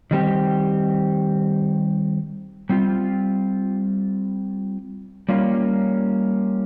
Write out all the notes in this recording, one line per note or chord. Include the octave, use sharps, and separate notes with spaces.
D#3 G3 C4 G4
G3 C4 F4
G3 A#3 C#4 F4